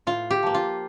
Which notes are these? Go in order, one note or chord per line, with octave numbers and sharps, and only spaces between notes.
A2 F4
G4
F3 A#3
F4